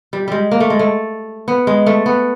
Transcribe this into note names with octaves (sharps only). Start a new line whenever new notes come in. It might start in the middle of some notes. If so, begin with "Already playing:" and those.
G3
G3 G#3
A#3
A3
G#3
A3
B3
G#3
A3
B3